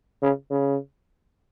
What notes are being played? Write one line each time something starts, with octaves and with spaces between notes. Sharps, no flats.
C#3
C#3